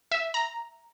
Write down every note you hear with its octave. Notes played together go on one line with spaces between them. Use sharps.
E5
A#5